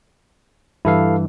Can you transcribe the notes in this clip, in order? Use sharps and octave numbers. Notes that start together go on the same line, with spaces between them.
G2 E3 E4 A4 F5